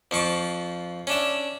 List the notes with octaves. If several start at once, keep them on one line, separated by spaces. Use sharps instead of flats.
F2 F3 C#6 D6
C#4 D4 E5